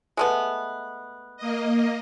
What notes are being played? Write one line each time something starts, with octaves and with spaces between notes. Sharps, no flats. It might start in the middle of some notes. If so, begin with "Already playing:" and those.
G#3 A3 B3
A#3 D#5